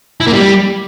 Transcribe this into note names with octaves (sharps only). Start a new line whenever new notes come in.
E4
A#3
G3